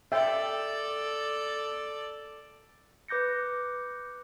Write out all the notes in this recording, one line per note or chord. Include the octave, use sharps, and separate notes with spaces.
A4 D5 E5 G5
B4 D6 G6 A#6 C#7